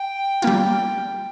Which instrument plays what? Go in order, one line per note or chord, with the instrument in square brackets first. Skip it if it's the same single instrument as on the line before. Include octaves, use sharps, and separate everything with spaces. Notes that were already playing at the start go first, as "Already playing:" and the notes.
Already playing: [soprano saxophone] G5
[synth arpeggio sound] G3 A#3 F4